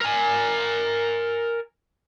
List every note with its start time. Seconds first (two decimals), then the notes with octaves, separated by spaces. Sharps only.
0.02 A#4 G#5